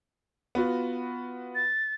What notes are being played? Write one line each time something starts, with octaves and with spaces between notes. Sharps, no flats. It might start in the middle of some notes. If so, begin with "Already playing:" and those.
B3 F4 F#4
A6